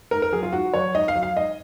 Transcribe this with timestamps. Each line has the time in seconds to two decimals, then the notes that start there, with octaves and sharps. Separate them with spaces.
0.11 G#2 A#4
0.22 A#4
0.32 F#3 G#4
0.43 F4
0.52 G#2 F#4
0.74 F#3 C#5
0.95 G#2 D#5
1.08 F5
1.15 F#3
1.23 F5
1.36 G#2 D#5